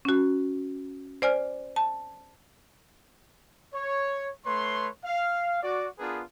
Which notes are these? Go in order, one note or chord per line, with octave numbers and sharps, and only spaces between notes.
C#4 F#4
C5 D5 G#5 F6
A5
C#5
A3 B4 C#5 C6
F5
F#4 D5
B3 D4 F4 G#4 A#4 B4